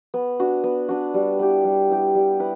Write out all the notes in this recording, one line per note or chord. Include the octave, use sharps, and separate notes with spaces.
B3
D4 F#4
B3
D4 F#4
G3
B3 E4 G4
G3
B3 E4 G4
G3
B3 E4 B4